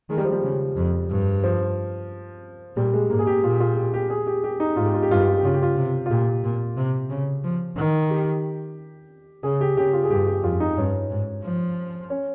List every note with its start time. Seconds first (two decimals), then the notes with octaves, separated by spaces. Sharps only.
0.10 D#3 G#3
0.18 G3
0.25 F3
0.32 G3
0.43 C#3
0.77 F2
1.10 G2
1.44 F3
2.76 A#2 G3
2.94 G#3
3.10 G#2 A#3
3.19 G#4
3.27 G4
3.43 A#2 F4
3.60 F4
3.77 G4
3.94 G4
4.10 G#4
4.27 G4
4.44 G4
4.60 D#4
4.76 G#2 F4
4.85 G4
4.94 F4
5.02 G4
5.10 G2 F4
5.20 G4
5.28 F4
5.37 G4
5.43 C#3 F4
5.54 G4
5.63 F4
5.77 C3
6.06 F4
6.10 A#2 G4
6.44 A#2
6.77 C3
7.10 C#3
7.44 F3
7.77 D#3
8.10 G4
9.43 C#3 G#4
9.61 G4
9.77 C#3 G4
9.93 F4
10.04 G#4
10.10 G2 G4
10.27 G4
10.43 F2 F4
10.60 D#4
10.77 G2 C#4
11.10 G#2
11.43 F3
12.10 C#4